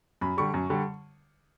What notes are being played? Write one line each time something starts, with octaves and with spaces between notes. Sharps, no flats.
F#2 B5
D3 G3 C#6
F#2
D3 G3